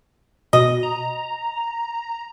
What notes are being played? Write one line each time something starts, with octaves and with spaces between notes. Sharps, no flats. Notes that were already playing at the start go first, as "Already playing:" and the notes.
B2 D#5
A#5